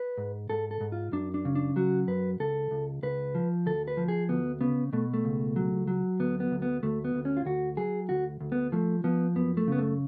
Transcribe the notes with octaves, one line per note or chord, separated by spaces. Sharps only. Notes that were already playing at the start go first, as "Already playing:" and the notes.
Already playing: B4
G#2
G#2 A4
A4
G#2
F4
F#2 D4
D4
C#3
D4
F#3 F#4
F#2 B4
C#2 A4
C#2
C#2 B4
F3
D2 A4
B4
F3
G#4
D2 B3
C#3 B3
B2 A3
A3
C#2
F#3
F#3
D2 B3
B3
D2
B3
D2 A3
B3
D2
C#4
F4
D2 F#4
F#3 G#4
D2 F#4
D2
B3
F3 A3
F3 B3
F#2 B3
A3
C#3 B3
A3